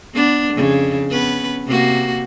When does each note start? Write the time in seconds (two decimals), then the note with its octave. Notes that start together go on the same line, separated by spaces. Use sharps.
0.14 B3 D4
0.54 F2 C#3
1.10 B3 C#4 B4
1.67 C3 A#3 F#4